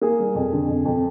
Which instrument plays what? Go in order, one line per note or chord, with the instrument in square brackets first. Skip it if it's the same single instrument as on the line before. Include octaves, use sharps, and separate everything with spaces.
[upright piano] A#3 G#4
G3
F2
D3
F2
F2